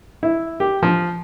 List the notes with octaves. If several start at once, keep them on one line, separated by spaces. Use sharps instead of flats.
E4
G4
F3